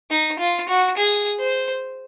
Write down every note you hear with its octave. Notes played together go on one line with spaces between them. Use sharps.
D#4
F4
F#4
G#4
C5